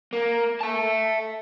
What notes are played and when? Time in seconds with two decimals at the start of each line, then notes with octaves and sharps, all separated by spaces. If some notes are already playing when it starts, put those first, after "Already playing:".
0.13 A#3
0.61 E5 A5